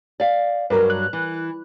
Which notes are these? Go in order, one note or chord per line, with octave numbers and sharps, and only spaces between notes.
D5 F5
G2 F#3 A#4 B4
F#6
E3